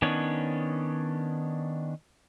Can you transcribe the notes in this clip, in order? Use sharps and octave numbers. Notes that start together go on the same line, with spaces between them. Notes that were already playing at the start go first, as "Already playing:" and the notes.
D#3 B3 C#4 D4 C#5